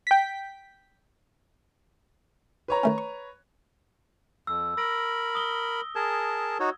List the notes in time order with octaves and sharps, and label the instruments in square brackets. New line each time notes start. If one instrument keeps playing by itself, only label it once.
[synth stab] G5 B6
[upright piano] B4 C#5 A#5
[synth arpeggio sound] D#3 A3 C#4
C#6
[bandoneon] F2 [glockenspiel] E6
[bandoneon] A#4 B5 [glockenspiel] E6 A#6 D7
[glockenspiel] D#6 G7
[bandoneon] G#4 A#4 A5 [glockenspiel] G#6
[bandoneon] D#4 F#4 C#5